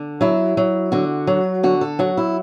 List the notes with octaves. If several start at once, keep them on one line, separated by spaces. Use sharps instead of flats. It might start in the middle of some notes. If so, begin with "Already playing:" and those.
Already playing: D3
F#3 E4
F#3
D3 F#4
F#3
D3 F#4
A4
F#3 F#4
E4